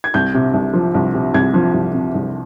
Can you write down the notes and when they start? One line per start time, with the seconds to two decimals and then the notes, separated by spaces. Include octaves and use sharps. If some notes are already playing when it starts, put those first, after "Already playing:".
0.04 G#6
0.14 C2 G6
0.34 C3
0.53 C2
0.73 F3
0.94 C2
1.14 C3
1.34 C2 G#6
1.54 F3
1.74 C2
1.94 C3
2.14 C2